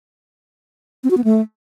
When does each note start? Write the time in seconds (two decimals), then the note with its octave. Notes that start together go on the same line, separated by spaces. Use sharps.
1.04 C4
1.11 F#4
1.17 B3
1.24 A3